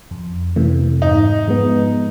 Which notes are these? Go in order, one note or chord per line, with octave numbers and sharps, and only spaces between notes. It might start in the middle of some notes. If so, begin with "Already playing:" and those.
F2
C3 E3 A3
G#2 D#4
F3 G#3 B3